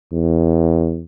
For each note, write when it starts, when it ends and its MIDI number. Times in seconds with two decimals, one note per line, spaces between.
0.13 1.04 40